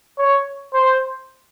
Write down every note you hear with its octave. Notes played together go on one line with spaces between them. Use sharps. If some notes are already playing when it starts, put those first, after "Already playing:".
C#5
C5